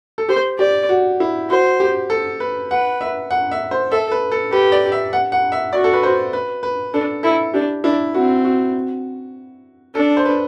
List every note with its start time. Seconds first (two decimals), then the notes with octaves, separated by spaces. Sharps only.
0.18 A4
0.29 G4 C5
0.59 G4 D5
0.89 F#4
1.20 E4
1.50 F#4 C5
1.80 G4
2.10 A4
2.40 B4
2.71 B4 F#5
3.01 E5
3.31 F#5
3.51 E5
3.71 C5
3.92 A4 E5
4.11 B4
4.32 A4
4.52 G4 B4
4.72 D5
4.92 E5
5.13 F#5
5.32 F#5
5.52 E5
5.73 F#4 D5
5.84 A4
5.93 B4
6.03 C5
6.33 B4
6.63 B4
6.94 D4 A4
7.23 E4 A4
7.54 D4 G4
7.84 D4 E4
8.14 C4 F#4
8.45 F#4
9.95 D4 A4
10.17 C5
10.26 B4